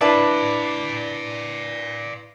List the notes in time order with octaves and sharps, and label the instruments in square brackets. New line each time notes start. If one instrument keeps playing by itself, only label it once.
[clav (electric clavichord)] D4 [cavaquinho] E4 B4 A5 [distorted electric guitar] D5 F5